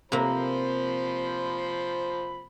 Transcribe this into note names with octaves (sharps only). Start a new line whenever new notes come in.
C3 F3 A#3 C5 B5